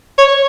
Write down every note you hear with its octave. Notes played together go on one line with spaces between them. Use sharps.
C#5